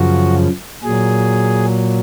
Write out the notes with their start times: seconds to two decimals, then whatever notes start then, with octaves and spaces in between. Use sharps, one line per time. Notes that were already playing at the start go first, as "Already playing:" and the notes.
Already playing: F#2 C#3 F3 F#4
0.84 A#2 F#3 G#4